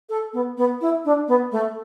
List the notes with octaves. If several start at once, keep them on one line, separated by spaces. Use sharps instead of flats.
A4
B3
B3
E4
D4
B3
A3